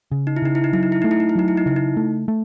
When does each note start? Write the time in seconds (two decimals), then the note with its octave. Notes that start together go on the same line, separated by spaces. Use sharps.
0.11 C#3
0.27 D#4
0.37 E4
0.42 C#3 D#4
0.55 E4
0.64 D#4
0.73 F#3 E4
0.83 D#4
0.92 E4
1.02 A3 D#4
1.11 E4
1.20 D#4
1.29 E4
1.36 F#3 D#4
1.48 E4
1.57 D#4
1.66 C#3 E4
1.76 D#4
1.97 A3
2.28 A3